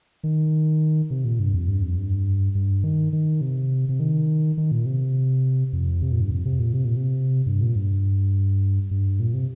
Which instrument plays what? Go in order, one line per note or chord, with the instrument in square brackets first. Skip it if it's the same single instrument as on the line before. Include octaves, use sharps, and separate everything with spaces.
[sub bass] D#3
C3
A#2
G2
F2
G2
F2
G2
G2
D#3
D#3
C3
C3
D#3
D#3
A#2
C3
F2
C3
A#2
G2
F2
C3
A#2
C3
A#2
C3
G2
A#2
G2
G2
A#2
C3